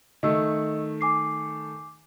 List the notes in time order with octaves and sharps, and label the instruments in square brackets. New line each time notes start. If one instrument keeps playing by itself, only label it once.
[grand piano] D#3 A3 [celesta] D#5 E6
[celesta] G#5 D6 C7